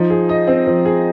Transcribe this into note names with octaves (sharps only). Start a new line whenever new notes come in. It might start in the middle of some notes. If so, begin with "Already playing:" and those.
Already playing: F3 D#4
G#4
D#5
C4
F3
G#4